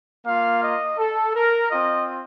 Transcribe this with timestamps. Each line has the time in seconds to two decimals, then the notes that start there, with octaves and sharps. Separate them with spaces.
0.25 A#3 F4 F5
0.61 D#5
0.98 A4
1.34 A#4
1.71 C4 F4 D#5